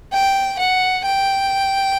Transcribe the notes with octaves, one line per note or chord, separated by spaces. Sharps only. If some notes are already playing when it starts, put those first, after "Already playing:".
G5
F#5
G5